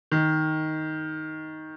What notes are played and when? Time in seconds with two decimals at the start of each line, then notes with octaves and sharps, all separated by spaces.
0.11 D#3